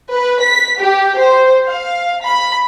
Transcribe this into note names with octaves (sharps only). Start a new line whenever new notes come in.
B4
B6
G4
C5
F5
B5